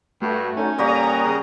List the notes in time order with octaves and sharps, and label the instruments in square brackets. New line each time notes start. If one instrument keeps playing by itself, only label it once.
[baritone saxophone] G2 [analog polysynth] A3 F#4
[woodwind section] F#2 D3 D#4 [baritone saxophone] C#4
[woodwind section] A#2 D3 A#3 [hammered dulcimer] G3 F#4 G4 [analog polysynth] A#5 D#6
[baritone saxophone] C#3